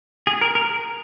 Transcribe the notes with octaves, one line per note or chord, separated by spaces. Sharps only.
G#4
A#4
A#4